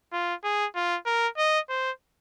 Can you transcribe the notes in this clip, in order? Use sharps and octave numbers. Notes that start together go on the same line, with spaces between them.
F4
G#4
F4
A#4
D#5
C5